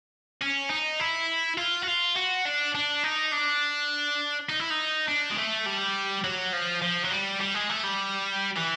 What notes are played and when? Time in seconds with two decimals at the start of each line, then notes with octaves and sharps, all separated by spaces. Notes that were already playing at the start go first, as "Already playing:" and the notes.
0.41 C#4
0.70 D#4
1.00 E4
1.58 F4
1.83 F#4
1.87 F4
2.16 F#4
2.45 D4
2.75 D4
3.04 D#4
3.33 D4
4.49 D#4
4.60 E4
4.70 D#4
5.08 D4
5.31 G#3
5.37 A3
5.66 G3
6.24 F#3
6.53 F3
6.82 F3
7.04 F#3
7.11 G3
7.40 G3
7.54 G#3
7.70 A3
7.84 G3
8.57 E3